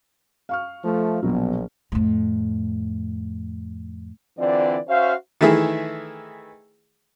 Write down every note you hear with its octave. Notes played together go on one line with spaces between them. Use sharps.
F5 C#6 F6
F3 A3
A#1 B2 F#3
F2 A2
D3 E3 C4 F4 D5
C#4 F#4 C5 E5 F5
D#3 E3 A3 E4 G#4